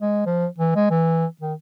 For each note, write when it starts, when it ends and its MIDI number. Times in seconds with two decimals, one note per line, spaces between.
0.01 0.25 56
0.26 0.46 53
0.58 0.72 52
0.76 0.86 56
0.90 1.26 52
1.41 1.54 51